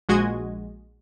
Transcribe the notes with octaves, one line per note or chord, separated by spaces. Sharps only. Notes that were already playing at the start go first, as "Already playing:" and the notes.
A#1 G#3 F#4 D#5 G#6